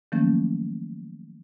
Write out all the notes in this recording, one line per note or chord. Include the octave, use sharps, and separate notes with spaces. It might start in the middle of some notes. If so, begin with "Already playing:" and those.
D#3 F3 F#3 A3 A#3 C#4